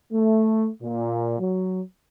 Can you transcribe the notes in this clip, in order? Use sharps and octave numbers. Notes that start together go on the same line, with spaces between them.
A3
A#2
F#3